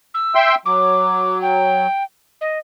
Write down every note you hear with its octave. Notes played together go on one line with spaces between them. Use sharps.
E6
E5 G5 C6
F#3 D6
G5
D#5